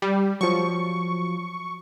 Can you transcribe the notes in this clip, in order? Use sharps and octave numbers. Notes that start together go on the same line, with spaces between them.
G3
F3 F#3 C#6